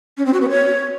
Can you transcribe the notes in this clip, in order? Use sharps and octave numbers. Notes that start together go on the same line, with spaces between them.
C#4
C4
F#4
B3
C#5